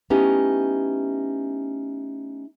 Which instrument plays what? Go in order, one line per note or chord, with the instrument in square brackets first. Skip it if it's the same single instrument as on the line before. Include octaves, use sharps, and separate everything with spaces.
[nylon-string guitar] A3 B3 C#4 D#4 E4 G4